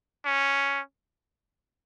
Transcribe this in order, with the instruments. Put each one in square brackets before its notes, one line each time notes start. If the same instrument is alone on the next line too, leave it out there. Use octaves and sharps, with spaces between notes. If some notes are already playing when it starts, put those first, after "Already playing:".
[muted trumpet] C#4